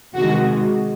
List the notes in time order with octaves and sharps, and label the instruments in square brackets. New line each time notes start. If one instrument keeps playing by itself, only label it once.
[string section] C3 D#3 G#3 F#4